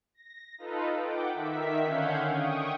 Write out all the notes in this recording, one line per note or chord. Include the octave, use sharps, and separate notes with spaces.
A#6
D#4 F4 A4 B4
F#5 G5 D6
D#3 E5 B6
D3 C#4 F5 F#5 G6 G#6
G5 C#6 D#6